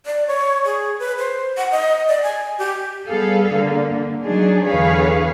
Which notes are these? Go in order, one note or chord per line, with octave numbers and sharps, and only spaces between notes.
D5
C#5
G#4
B4
C5
F#5
D#5
D5
G#5
G4
G3 B3 G#4 A4 F5
D3 A#3
F#3 D4 D#4 G#4
E2 D3 G#4 B4 C#5 F5